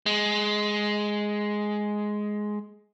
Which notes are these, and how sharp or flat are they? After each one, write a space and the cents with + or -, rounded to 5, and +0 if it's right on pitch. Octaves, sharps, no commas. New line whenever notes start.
G#3 +5